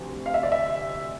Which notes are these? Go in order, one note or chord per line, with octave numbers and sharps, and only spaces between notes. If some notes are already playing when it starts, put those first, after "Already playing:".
Already playing: D2 C3 F3
F5
E5
D5
E5